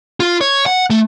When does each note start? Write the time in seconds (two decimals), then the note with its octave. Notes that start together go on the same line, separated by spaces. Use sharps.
0.20 F4
0.41 C#5
0.66 F#5
0.90 A3